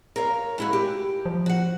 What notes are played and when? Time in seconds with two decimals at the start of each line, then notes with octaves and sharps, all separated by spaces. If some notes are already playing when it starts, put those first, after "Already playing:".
0.16 A#4 C#5 F5
0.58 G#3 E4 F#4
0.73 G4
1.26 F3
1.46 F#4 F#5